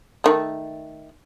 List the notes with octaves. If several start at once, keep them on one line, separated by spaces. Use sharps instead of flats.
D#3 A3